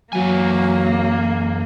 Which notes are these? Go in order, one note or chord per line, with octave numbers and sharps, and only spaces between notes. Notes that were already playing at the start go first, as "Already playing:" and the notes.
F#2 E3 F#3 A#3 G#5